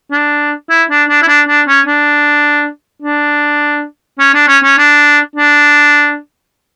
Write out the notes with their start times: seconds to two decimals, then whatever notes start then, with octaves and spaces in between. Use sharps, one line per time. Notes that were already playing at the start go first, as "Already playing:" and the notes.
0.11 D4
0.70 E4
0.90 D4
1.09 D4
1.22 E4
1.28 D4
1.48 D4
1.68 C#4
1.86 D4
3.02 D4
4.19 C#4
4.34 D4
4.48 C#4
4.63 C#4
4.78 D4
5.36 D4